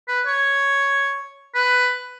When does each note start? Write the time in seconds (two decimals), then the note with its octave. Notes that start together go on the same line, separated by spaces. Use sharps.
0.08 B4
0.27 C#5
1.55 B4